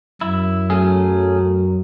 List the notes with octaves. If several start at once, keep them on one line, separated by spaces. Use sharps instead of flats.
F#2 E4
F#3 A3 C#4 G#4